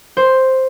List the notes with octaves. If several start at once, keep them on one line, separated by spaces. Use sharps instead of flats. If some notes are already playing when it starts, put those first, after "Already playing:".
C5